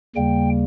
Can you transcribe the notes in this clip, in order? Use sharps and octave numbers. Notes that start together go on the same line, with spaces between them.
D#2 C#3 G3 A#3 G5